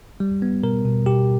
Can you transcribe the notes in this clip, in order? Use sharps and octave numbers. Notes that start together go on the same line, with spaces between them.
G3
B3
B2 A#4
B2
B2 G4